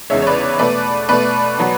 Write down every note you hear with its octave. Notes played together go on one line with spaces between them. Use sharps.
E2 C#3 G#3 C#5 E5
C#5
B4 D5
B2 A3 B4 D5
B2 A3 B4 D5
B2 F#3 B3